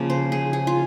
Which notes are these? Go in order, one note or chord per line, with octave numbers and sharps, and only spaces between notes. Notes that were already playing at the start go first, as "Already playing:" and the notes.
Already playing: C#3 F3 A#3
C5
G#4
G#4
F4